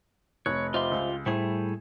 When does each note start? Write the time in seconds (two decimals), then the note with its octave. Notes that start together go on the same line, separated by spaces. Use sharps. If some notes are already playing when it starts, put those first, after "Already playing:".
0.46 F1 C#5 F#6
0.74 F4 G4 C5 D#5 E5 C6
0.92 C#2
1.26 A2 G3 A3 E4 G#4 C5